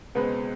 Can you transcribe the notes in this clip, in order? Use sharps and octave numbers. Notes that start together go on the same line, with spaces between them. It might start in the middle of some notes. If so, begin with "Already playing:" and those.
C#2 B2 G#3 B3 C4 B4